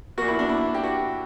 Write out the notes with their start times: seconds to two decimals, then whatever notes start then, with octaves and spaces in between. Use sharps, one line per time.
0.18 A#2 A#3 F#4
0.28 E4
0.39 D4
0.49 E4
0.74 G4
0.84 F#4